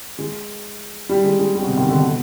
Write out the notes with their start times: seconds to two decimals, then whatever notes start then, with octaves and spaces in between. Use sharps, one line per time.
0.19 G#3
1.09 G3
1.24 G#3
1.39 G#3
1.55 G3
1.62 B2
1.66 C3
1.77 D#3
1.89 D3
2.00 B2